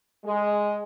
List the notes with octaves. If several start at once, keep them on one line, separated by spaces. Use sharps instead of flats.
G#3